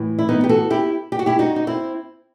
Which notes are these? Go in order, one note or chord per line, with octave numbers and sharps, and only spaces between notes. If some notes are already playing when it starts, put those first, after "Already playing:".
Already playing: A2 E3
E4
B3 D#4
G4
F#4 A4
E4 G4
G4
F#4
E4 G4
D#4 F#4
D#4
C4 E4